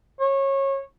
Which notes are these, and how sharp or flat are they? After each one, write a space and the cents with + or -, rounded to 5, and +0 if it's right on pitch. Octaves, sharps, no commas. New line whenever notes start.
C#5 -25